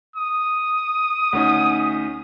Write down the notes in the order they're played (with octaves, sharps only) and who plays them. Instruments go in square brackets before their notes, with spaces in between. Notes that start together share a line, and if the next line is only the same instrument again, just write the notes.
[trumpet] D#6
[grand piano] D2 C#4 D#4